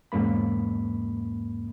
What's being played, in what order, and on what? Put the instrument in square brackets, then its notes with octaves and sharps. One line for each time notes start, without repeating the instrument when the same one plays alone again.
[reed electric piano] E2 G#2 C#3 A#3 B5